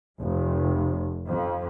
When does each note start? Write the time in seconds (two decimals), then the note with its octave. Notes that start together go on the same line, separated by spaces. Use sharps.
0.20 F1
1.28 F2